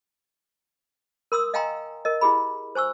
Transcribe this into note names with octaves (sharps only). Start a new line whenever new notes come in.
A#4 C6 D#6 E6
D#5 F5 G5 G#5 A#5 C6
A#4 D#5
E4 G4 G#4 B5
C5 G#5 C#6 E6